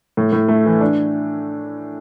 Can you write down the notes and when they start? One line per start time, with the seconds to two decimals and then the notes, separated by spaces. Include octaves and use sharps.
0.17 A2
0.32 A2
0.49 A3
0.66 E3
0.81 D4